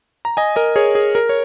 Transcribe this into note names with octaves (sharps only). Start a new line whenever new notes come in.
A#5
D#5 G#5
A#4 D#5
G#4 C#5
G#4
A#4
C#5